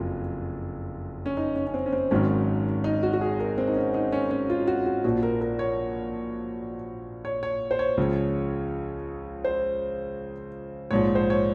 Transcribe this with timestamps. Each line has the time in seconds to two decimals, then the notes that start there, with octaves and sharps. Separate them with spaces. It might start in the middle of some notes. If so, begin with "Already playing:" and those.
Already playing: F#1 F2 F#3 F4
1.26 C#4
1.37 D#4
1.56 C#4
1.67 C#4
1.74 C4
1.86 C#4
1.92 C4
2.11 G#1 G#2 D#3 F#3 C#4
2.84 D#4
3.03 F#4
3.13 F#4
3.21 G#4
3.40 A#4
3.58 C4
3.68 D#4
3.76 C#4
3.94 D#4
4.12 C#4
4.31 C#4
4.50 F4
4.67 F#4
4.86 F#4
5.04 A#1 A#2 F3 F#4
5.23 A#4
5.41 A#4
5.59 C#5
7.25 C#5
7.43 C#5
7.71 C5
7.79 C#5
7.97 C#2 C#3 F3
9.44 C5
10.91 A#1 G#2 F3 C#5
11.15 C5
11.30 C#5